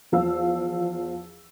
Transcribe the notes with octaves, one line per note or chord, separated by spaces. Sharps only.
E2 F3 F5 E6